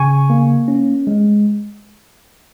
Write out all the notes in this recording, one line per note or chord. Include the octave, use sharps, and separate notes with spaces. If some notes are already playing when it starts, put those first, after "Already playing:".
Already playing: C#3 G#5 C#6
A#3
C#4
G#3